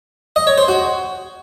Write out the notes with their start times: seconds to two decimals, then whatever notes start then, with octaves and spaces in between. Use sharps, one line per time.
0.36 D#5
0.47 C#5
0.58 C5
0.68 F#4